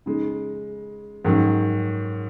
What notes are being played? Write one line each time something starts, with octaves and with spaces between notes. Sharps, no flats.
C#3 G#3 D#4
G#2 D#3 F#3 C#4